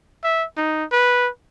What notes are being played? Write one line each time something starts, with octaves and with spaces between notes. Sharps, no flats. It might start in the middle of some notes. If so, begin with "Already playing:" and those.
E5
D#4
B4